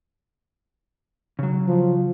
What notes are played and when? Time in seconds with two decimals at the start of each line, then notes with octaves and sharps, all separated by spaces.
1.39 C#3 F#3
1.68 F3